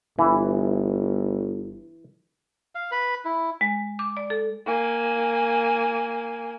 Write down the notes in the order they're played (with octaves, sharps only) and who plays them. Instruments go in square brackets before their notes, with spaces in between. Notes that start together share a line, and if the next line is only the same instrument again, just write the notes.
[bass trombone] G1 [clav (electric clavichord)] E3
[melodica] F5
B4
E4
[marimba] G#3
D6
D5
A4
[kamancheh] A#3 G#5